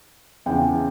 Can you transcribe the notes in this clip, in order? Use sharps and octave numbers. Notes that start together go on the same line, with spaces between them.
E2 C#3 E3 G5